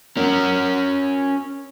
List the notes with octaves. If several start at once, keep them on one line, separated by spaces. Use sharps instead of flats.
C#4 A#4